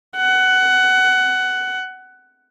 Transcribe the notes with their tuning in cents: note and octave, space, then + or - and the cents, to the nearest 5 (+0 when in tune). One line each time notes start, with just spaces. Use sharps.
F#5 +15